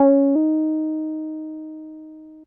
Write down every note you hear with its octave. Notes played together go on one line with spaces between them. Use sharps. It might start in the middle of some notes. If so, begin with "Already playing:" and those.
Already playing: C#4
D#4